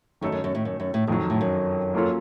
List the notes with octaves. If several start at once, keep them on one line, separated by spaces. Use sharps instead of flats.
F#2 D#3 A3 D#4 A4
F#2
F#2
A2
F#2
F#2
A2
F2 A2 D#3 F#3
A2
F#2
F#3 A#3 C#4 F4 A4